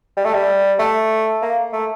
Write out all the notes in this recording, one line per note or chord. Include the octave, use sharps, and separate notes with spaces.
G3
A3
G3
A3
A#3
A3